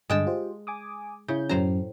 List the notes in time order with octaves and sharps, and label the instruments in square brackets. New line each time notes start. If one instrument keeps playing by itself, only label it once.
[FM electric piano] G2 D3 [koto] G#3 G5 A5
[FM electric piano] F4 G4 C5
G#5 D6 D#6
[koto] C#3 [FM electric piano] E4 G6
[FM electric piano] F#2 F#3 C#4 [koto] A2 C5 A#5